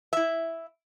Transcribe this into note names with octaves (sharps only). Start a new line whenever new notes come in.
E4 E5